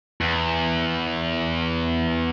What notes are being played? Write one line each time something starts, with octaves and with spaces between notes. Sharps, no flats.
E2